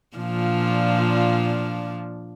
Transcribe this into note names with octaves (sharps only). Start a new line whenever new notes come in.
A#2 F3 D4